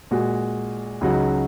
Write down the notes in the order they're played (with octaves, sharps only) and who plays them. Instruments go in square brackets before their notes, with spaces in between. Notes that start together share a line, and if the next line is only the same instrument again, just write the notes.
[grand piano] A#2 G#3 F#4
C#2 C#3 F#3 D#4 F#4